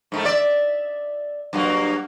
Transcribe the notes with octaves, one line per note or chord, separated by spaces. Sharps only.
G#2 D#3 A3
D5 E5
G2 F#3 A#3